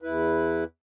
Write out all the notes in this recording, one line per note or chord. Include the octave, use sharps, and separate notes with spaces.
E2 E4 B4